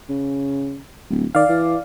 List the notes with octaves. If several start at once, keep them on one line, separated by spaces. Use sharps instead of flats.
C#3
D1
D#3 D5 F5
E3